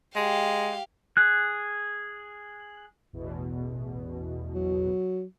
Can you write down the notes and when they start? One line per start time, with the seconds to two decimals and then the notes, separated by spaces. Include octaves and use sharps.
0.16 G#3 G4 F5
1.17 G#4 F#6
3.13 A1 E2 B2
4.54 F#3